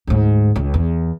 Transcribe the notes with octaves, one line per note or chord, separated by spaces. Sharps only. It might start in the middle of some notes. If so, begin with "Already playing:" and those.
D2 G#2
C#2
E2